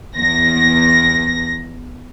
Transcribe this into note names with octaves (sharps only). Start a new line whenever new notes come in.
E2 A#6